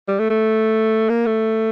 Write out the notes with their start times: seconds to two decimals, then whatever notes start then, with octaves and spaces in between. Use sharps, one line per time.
0.08 G3
0.19 A3
0.30 A3
1.09 A#3
1.26 A3